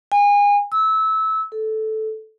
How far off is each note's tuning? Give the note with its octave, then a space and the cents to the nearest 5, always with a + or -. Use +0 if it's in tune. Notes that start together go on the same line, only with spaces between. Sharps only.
G#5 -30
E6 -20
A4 -10